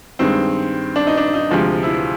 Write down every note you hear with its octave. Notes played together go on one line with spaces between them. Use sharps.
G2 D#3 G#3 C4
D4
D#4
D4
D#4
D2 C3 F3 G#3
E4